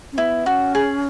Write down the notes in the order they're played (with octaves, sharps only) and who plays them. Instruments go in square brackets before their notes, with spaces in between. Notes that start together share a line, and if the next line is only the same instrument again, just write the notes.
[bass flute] C#4
[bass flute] B3 [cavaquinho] E4
[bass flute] C#4 [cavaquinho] F#4
[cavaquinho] G#4